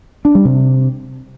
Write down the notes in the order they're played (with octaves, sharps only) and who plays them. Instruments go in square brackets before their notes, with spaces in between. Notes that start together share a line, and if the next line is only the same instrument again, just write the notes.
[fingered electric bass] D4
G3
C3